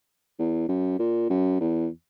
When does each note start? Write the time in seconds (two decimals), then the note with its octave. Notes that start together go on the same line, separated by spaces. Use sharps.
0.39 E2
0.69 F#2
0.99 A#2
1.30 F#2
1.61 E2